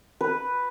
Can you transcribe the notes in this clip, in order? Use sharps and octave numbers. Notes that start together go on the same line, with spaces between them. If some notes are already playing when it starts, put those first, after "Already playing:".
B4